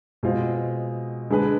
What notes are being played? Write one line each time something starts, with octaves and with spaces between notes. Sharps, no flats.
B2 G#3 C4 F4
D3 G#3 D4 G#4 B4